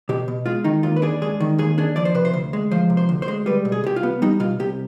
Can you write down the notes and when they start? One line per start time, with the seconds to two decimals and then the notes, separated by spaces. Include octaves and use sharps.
0.09 B2 G4
0.28 B2
0.46 G#3 F4
0.64 D#3 D#4
0.83 D#2 F4
0.96 B4
1.02 D4 G#4
1.22 G#3 G#4
1.40 D#3
1.58 D#2 G#4
1.78 D4 G#4
1.96 F3 D5
2.05 C5
2.15 C3 B4
2.25 C5
2.33 D2
2.53 G#3
2.71 F3 C5
2.90 C3
2.97 C5
3.09 D2
3.22 C5
3.28 G#3
3.46 G3 B4
3.65 B2
3.72 G#4
3.84 C2 G4
3.96 F4
4.03 B3
4.22 G3 D#4
4.40 B2 F4
4.60 C2 G4